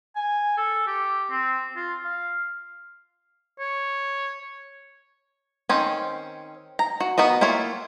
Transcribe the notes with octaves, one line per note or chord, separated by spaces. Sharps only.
G#5
A4
G4
C4
F4
F5
C#5
D#3 C4 C#4
A#5
F#4
B3 F#4 A#4 D#5
A#3 E4 F4 C#5